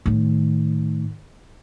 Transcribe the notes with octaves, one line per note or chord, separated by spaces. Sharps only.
A2 D#3